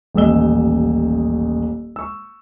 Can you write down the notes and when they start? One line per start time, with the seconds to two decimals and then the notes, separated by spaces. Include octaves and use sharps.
0.14 D#1 A1 D#5 E6 G7
1.96 C#6 E6